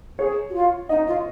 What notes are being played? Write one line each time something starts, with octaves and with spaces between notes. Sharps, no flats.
G#4 C#5
F#4
F4
D#4 D#5
F4